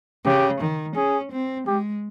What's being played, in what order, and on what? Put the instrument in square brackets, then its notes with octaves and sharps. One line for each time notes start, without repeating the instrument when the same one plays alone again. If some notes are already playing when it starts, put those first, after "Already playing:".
[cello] C#3 [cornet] G4
[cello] D#3
[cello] C#4 [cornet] G#4
[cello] C4
[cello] G#3 [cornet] G4